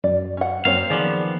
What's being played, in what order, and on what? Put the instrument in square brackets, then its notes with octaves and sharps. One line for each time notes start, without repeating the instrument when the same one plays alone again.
[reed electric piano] F#2 [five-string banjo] D5
[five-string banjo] C#4 F#5
[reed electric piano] F#2 [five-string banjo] A#3 C4 C#5 [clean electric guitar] F5
[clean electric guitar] D#3 F3 B3 [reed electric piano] G#4 D5